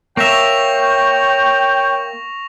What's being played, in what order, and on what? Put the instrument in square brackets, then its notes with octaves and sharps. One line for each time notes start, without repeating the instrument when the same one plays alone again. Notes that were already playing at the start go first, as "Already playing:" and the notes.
[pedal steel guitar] A#3 E5 [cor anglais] C#5 [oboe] G5 [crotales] C#6 A#6 F7